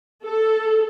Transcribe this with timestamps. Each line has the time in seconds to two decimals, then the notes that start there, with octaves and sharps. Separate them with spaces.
0.24 A4